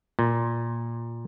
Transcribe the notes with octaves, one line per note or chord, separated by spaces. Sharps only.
A#2